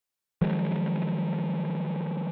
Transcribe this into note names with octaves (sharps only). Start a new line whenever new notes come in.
D#3 F3 F#3 G#3